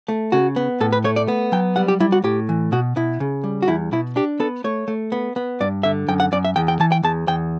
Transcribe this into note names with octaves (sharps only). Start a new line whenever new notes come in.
A3
C#3 F#4
B3
A2 A4
B4
A3 C#5
D5
B3
F#3 G5
G3 F#5
G4
G3 E4
F#4
A2 G4
E3
B2 F#4
B2 E4
C#3
G3
F#4
E2 E4
B2 E4
D4 G4
B3 A4
A3 C#5
A3
B3
B3
G2 D5
D3 E5
F#2 G5
F#5
F#2 D5
E5
E2 G5
G5
E3 A5
G5
E2 A5
E2 G5